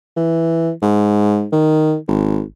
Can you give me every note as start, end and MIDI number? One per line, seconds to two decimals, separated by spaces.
0.17 0.71 52
0.82 1.47 44
1.52 1.96 51
2.08 2.42 32